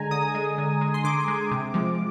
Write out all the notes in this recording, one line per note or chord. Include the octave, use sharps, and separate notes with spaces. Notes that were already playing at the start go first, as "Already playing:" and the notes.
Already playing: D3 G#3 G#5 A#5
D3 D#6
G#3
D3
G#3
C6
D3 D6
G#3
C3
F3 G#3